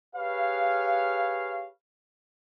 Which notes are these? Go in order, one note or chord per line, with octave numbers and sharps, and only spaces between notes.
G4 G#4 B4 C#5 F5